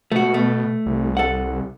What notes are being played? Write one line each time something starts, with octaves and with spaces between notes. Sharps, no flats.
B2 A3 F#4
A3
C2
A4 F#5